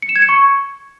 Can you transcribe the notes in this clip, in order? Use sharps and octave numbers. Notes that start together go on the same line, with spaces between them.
C#7
E7
G#6
C#7
C#6